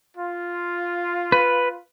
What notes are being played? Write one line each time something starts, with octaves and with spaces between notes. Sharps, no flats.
F4
B4